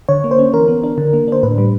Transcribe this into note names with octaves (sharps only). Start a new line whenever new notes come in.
D3 C#5
A#3
C5
C#4
E3 A#4
B3
D4
D3
A#3
D4 C5
A2 B4
G3